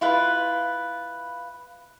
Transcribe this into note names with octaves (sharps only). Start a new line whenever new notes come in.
E4 F4 B4